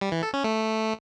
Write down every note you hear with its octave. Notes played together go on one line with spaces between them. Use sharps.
G3
E3
A4
C#4
A3